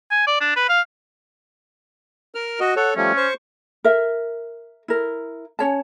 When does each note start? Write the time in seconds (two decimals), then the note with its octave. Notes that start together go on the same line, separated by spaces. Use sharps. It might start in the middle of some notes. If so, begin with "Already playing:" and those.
0.11 G#5
0.27 D5
0.41 D4
0.56 B4
0.69 F5
2.35 A#4 F6
2.60 F#4 D#5
2.76 A4 C#5 F#5
2.96 F3 G3 A3 C#4
3.17 C5 C#6
3.84 A#4 E5
4.88 E4 A#4
5.59 C#4 C#5 A5